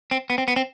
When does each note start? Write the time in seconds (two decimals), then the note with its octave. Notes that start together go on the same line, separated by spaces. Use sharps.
0.11 C4
0.30 B3
0.38 C4
0.48 B3
0.56 C4